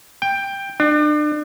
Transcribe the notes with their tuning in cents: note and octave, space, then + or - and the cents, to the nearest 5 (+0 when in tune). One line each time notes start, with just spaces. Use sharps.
G5 +10
D4 +35